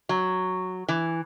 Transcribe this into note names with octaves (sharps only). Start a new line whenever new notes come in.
F#3
E3